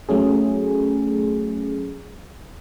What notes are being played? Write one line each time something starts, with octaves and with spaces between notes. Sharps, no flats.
F#3 A3 C#4 G#4